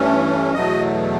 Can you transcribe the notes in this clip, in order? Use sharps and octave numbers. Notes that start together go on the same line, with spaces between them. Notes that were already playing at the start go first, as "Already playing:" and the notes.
Already playing: G2 E3 A3 C#4
E2 B2 F#3 A3 D#5